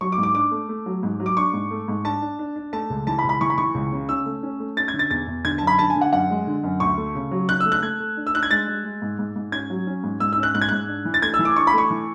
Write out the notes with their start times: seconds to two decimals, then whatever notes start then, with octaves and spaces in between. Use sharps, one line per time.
0.01 F#3 C#6
0.12 D6
0.18 G#2
0.23 D6
0.35 D4 D6
0.51 A3
0.69 A3
0.86 F#3
1.03 G#2
1.20 F#3
1.26 D6
1.37 D4 C#6
1.53 G#2
1.71 A3
1.88 G#2
2.05 D4 A5
2.22 D4
2.39 D4
2.56 D4
2.73 A3 A5
2.90 C#2
3.07 E3 A5
3.19 B5
3.24 C#2
3.29 B5
3.41 E3 C#6
3.50 B5
3.58 E3 C#6
3.74 C#2
3.92 C#3
4.09 C#4 E6
4.26 A3
4.43 C#4
4.60 A3
4.77 C#4 A6
4.88 G#6
4.94 D3
4.99 A6
5.10 E2 A6
5.27 E2
5.45 D3 G#6
5.58 F#2 A5
5.67 B5
5.79 D3 A5
5.90 G#5
5.96 D3
6.01 F#5
6.13 F#2 F#5
6.30 G#3
6.47 D3
6.64 F#2
6.80 D2 C#6
6.98 A3
7.15 C#3
7.31 F#3
7.48 C#3 F#6
7.60 E6
7.66 A3
7.72 F#6
7.83 A3 G#6
8.00 A3
8.17 D4
8.27 E6
8.34 D4 F#6
8.43 G#6
8.51 G#3 A6
8.68 G#3
8.84 G#3
9.02 G#2
9.19 G#2
9.36 G#2
9.52 C#4 G#6
9.70 F#3
9.87 C#4
10.03 G#2
10.20 G#2 E6
10.33 E6
10.38 C#4
10.43 F#6
10.54 G#2 F#6
10.62 G#6
10.69 G#2 F#6
10.88 D4
11.05 E3
11.14 A6
11.22 A3 G#6
11.34 E6
11.39 E3
11.45 D6
11.56 D4 C#6
11.67 B5
11.73 A3 C#6
11.91 E3